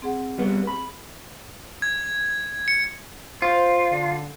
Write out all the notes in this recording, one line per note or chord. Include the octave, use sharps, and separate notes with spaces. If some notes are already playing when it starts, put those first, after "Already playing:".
C4 G#4 F#5
G3 B3
B5
G#6
C#7
F4 C5
D3